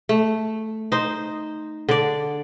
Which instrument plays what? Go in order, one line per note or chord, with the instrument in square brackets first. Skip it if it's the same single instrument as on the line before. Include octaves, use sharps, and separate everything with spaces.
[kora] A3
D#4 C5
D3 D5